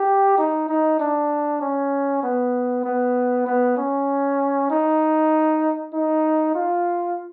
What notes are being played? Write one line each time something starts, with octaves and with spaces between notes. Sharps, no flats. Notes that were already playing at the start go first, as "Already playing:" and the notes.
Already playing: G4
D#4
D#4
D4
C#4
B3
B3
B3
C#4
D#4
D#4
F4